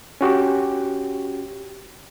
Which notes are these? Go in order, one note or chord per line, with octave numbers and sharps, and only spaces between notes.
C#4 F#4 G4